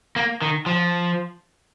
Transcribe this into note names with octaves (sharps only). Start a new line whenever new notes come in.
A#3
D#3
F3